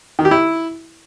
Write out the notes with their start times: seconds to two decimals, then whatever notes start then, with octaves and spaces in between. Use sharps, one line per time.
0.19 D#3
0.25 G4
0.31 E4